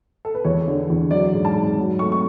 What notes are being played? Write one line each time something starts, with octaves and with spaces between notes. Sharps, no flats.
A4
B4
E2 C#5
D3
E2
F#3 D5
G#2
A5
G#2
F#3
A3 C#6
C#6